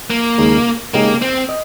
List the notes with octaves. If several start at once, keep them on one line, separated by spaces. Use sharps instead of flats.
A#3
D#2 C#3 G#3 D#4 G#4
C#3 G#3 A#3 D#4 G4 A#4
C4
D#5